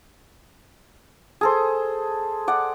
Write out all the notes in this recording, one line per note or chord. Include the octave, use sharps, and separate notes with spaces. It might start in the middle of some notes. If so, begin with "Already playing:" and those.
G#4 A4 C5
D5 F#5